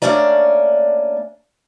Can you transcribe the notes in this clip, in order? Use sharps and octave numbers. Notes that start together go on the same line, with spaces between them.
A3 A#3 C#4 D4 D5 A#5